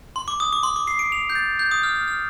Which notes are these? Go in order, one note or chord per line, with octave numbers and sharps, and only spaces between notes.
C6
D6
D#6
D6
C6
D6
C7
D7
F7
G6
A6
G6
D#6
F6
F6
F6